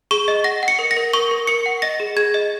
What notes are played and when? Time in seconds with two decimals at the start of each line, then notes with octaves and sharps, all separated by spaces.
0.11 G#4 C#6
0.28 D#5
0.44 F#5 A#6
0.63 F#5
0.68 C#7
0.79 A#4
0.91 A#6
0.97 A#4
1.13 A#4 C#6
1.31 A#4
1.47 A#4 C#7
1.66 F#5
1.82 D#5 A#6
2.00 G#4
2.16 G#4 G#6
2.34 D#5